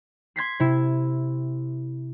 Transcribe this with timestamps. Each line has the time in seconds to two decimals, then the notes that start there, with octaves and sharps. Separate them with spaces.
0.36 C6 G#6 B6 C7
0.60 C3 E4